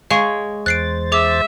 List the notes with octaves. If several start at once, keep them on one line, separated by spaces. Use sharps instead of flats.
G#3 C#5 F5 C#6
E2 C5 F#6 A6 C7 D7
G#4 E5 D6